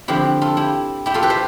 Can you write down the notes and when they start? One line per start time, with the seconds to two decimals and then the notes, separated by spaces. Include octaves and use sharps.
0.08 D3 F3 C4 E4 G4
0.42 F4 A4
0.57 E4 G4
1.06 E4 G4
1.14 F4 A4
1.23 G4 B4
1.30 C5 E5